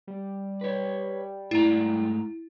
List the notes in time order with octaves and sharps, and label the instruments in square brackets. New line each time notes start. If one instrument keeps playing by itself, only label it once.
[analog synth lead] G3
[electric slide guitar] B4 C#5
[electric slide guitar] G#2 A3 A#5 [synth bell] E4